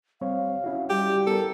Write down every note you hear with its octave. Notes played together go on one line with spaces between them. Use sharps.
G3 C4 C#5 F5
C#4 E4 F#4
G3 G4
B3 A4 A#4